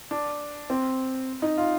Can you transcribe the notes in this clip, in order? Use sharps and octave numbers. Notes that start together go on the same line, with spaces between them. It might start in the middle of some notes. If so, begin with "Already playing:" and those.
D4
C4
D#4
F4